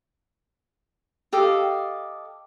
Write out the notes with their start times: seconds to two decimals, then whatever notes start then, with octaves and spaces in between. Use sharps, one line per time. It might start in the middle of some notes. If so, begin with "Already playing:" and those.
1.33 G4 A4 D#5 F5